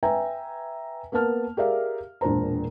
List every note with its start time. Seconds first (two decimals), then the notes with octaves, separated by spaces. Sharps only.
0.03 B4 E5 G5 G#5 A#5
1.12 A#3 B3 A#4 A5 F6
1.57 G4 G#4 A#4 D5 E5 F5
2.21 E1 A#2 D4 C5 A#5